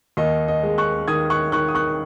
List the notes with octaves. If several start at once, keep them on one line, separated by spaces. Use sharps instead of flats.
D#2 D#5
D#5
G#3
C#6 F#6
D#3 D#6 G#6
C#6 F#6
D#3 C#6 F#6
D#6
C#6 F#6